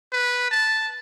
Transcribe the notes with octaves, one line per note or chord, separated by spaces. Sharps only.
B4
A5